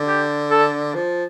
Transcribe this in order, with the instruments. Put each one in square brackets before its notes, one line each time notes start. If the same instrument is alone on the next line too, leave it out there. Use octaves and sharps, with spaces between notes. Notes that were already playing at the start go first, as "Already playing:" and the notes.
Already playing: [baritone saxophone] D3
[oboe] G4
A4
[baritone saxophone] F3